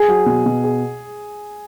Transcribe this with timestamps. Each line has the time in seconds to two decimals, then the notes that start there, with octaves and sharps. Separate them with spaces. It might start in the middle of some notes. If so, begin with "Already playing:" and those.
Already playing: G#4
0.08 F#3
0.26 B2
0.46 B2
0.64 G#4